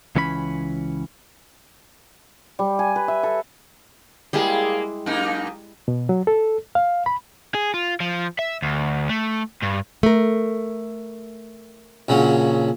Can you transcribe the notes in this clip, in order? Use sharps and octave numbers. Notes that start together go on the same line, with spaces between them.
C#2 E3 C#4 D5 B5
G3
G#5
B4
E5
A4
G3 G#3 A#3 E4 G#4
F#2 A#3 D#4
B2
F#3
A4
F5
B5
G#4
F4
F3
E5
D2
A3
G2
A3 A#4
A#1 C#3 F#3